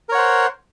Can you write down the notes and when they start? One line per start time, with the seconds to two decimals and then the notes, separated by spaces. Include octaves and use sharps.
0.09 A#4
0.12 C#5
0.15 F#5
0.18 C5